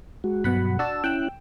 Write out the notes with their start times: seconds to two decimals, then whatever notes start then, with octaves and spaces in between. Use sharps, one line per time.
0.24 G#3 F#4
0.44 G2 B2 F#3 F#5 B5
0.79 D4 F#4 A5 E6
1.04 C#4 E4 G5 E6 F#6